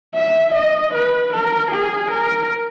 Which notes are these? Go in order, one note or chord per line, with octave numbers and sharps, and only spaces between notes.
E5
D#5
B4
A#4
G#4
A#4